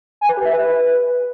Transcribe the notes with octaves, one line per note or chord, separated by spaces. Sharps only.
G#5
B4
G4
E5
B4